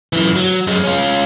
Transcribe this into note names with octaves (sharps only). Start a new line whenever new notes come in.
F#2 E3
F#3
F#2 G#3
C#4 F4